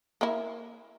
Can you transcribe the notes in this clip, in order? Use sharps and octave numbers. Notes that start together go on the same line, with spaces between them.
A#3 E4